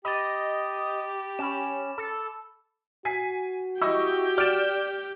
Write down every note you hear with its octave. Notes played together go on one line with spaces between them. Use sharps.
G4 D#5 B5 D6 A6
C#4 B5 E7
A4
F#4 G#5 B6 C7
E4 G4 D#5 G5 C#6 E6
D5 F6 D7 E7